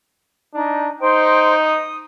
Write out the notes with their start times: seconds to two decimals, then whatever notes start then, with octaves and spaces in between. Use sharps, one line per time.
0.54 D4 D#4
1.01 D#4 C5 G5 C6
1.62 D#6